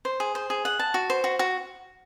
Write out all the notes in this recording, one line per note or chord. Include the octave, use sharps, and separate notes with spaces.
C5
G#4
C5
G#4
F#5
A5
F#4
C5
F#4
F#4